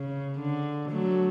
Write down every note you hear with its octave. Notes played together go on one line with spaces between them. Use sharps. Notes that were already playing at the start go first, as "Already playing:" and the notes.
Already playing: C#3
D3
F#3 A3